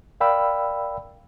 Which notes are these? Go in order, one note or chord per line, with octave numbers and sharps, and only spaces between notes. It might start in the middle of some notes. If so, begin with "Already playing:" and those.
A#4 D5 F5 G5 B5 E6